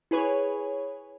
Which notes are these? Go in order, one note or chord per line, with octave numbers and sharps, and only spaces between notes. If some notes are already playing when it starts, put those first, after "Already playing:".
E4 G#4 B4 C#5